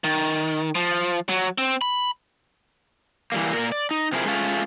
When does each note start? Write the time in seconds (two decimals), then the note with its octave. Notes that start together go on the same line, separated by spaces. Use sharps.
0.04 D#3
0.75 F3
1.29 F#3
1.58 C4
1.81 B5
3.32 E3 G3 A#3
3.53 A#2 A#4
3.72 D5
3.91 D#4
4.12 C3 F3 C4 E4 G#4 A#4
4.25 G#3 A3 C#4 F4